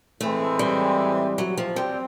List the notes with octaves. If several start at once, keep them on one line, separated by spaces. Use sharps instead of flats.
A2 E3 G#3 A3 C4 E4
G3
F#3
F3
G3 C4